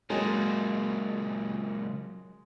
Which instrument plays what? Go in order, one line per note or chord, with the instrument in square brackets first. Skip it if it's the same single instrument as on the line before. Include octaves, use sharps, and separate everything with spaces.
[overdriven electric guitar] C#2 A#2 [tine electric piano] F#3 [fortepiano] G#3 [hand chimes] A#4 D#5 G5